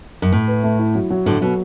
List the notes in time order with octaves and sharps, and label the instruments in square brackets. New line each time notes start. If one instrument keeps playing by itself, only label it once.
[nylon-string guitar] F#2
[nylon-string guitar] A2 [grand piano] A3
[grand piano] B4
A3
E4
F#3
F#3
[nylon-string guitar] A2 D3 [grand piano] A4
[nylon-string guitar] B2 [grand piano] F#3